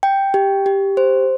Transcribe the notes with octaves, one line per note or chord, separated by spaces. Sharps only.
G5
G4
G4
C5